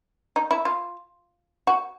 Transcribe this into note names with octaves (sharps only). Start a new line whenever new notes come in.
D#4
E4
F4
F#4